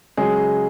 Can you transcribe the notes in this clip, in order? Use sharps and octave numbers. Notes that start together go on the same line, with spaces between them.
C#3 F#3 G#3 G#4